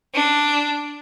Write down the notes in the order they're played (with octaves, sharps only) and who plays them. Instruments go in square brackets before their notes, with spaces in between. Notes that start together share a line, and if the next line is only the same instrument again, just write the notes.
[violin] D4